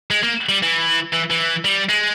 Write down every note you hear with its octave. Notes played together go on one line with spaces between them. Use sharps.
G#3
A#3
G3
E3
E3
E3
G3
G#3